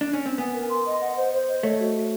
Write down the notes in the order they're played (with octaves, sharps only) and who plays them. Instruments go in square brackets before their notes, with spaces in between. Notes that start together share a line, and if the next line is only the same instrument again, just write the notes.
[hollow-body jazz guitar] D4
C#4
C4
[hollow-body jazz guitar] B3 [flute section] G#5
[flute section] A#4
C6
D#5
F#5
C5
C5
D#5
[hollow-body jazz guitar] A3 [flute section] C#5
[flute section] F#4
F#4